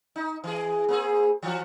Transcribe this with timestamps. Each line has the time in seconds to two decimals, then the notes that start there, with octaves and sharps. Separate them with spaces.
0.16 D#4
0.44 E3 G#4
0.88 A#3 C4 G#4
1.43 E3 F3 F#4